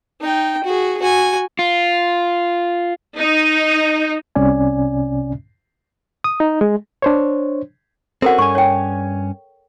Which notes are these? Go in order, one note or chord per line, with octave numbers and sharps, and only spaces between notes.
D#4 G5
F#4 G#4
F#4 G#5
F4
D#4
C2 C3 C#4 D5 G#5
D#6
D#4
G#3
D4 C5 C#5
C4 C#4 F#4 A4 A#4 F#5
G2 C#4 G#5 C#6
C#5 G5